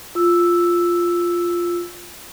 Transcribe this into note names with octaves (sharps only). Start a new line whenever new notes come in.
F4 E6